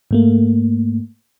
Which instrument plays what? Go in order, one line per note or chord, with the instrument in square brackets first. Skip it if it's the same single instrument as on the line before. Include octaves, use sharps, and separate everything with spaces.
[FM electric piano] G#2 A3 A#3